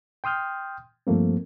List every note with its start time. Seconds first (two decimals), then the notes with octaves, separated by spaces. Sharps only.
0.24 G5 C6 D#6 F6 G6
1.07 G2 F3 A3 A#3 C4